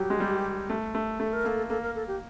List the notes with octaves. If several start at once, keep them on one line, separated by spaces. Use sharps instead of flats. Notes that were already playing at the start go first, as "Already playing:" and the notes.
Already playing: F#3 G3 G4
G#3
G3
A3
A3
A3 A4
A#4
A#3 A4
A#3 A4
A#4
A4
G4